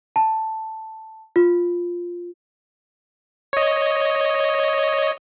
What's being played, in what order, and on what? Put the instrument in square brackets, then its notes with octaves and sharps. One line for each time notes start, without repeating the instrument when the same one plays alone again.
[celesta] A5
F4
[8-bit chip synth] C#5 D#5